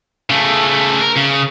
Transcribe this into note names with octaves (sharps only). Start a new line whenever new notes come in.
C#3 A3
A#4
C#3